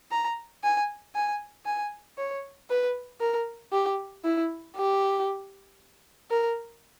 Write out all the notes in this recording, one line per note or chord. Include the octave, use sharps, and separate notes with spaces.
A#5
G#5
G#5
G#5
C#5
B4
A#4
G4
E4
G4
A#4